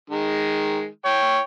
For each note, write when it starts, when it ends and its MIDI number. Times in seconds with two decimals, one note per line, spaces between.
0.10 0.87 51
0.10 0.87 56
1.05 1.39 73
1.05 1.39 79